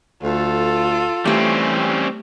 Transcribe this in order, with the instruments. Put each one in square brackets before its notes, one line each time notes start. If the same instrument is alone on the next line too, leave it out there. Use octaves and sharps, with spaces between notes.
[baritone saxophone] D2 [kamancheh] F4 A4
[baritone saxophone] E3 [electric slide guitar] G3 C4 C#4 [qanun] A3 G4